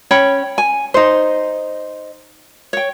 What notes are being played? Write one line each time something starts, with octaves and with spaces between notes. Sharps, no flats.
C#4 C#5 G5 B5
G#5
D#4 C5
C#5 G5